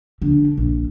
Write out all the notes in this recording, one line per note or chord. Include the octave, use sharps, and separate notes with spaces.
D3
A#1